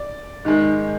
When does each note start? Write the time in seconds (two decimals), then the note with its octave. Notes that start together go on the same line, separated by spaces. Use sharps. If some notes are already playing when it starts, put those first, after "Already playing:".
Already playing: D5
0.45 G#2 D#3 G#3